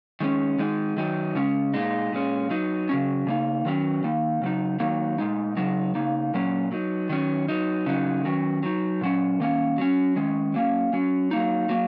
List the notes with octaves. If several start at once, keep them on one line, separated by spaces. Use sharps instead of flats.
D#3 G#3 C#4
D#3 G#3 D#4
D#3 F#3 D#4
C#3 G#3 C#4
A#2 G#3 D#4
A#2 G#3 C#4
F#3 D#4
C#3 F#3 C#4
C#3 A#3 D#4
D#3 F#3 C#4
D#3 A#3 D#4
C#3 F#3 D#4
D#3 F#3 A#3 D#4
A#2 G#3 D#4
C#3 F#3 D#4
C#3 A#3 D#4
A#2 F#3 A#3 C#4
F#3 D#4
D#3 F#3 C#4
F#3 D#4
C#3 F#3 D#4
D#3 F#3 C#4
F#3 D#4
A#2 F#3 C#4
D#3 A#3 C#4
F#3 C#4
D#3 G#3 C#4
F#3 A#3 C#4
F#3 C#4
F#3 A#3 D#4
F#3 A#3